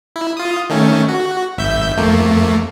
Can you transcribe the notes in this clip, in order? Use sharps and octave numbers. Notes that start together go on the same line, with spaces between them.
E4
F4 D#6
D#3 A3 C#4
F#4
G#1 E5 G6
F2 A3 A#3